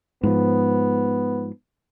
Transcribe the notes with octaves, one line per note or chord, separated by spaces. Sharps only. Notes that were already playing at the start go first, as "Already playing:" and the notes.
G#2 F3 B3